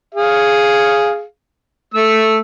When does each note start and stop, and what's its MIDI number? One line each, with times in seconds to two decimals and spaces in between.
0.15 1.23 68
0.15 1.23 77
1.94 2.39 57
1.94 2.39 88